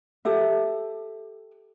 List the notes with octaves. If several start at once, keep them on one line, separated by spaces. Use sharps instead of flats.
G4 A4 E5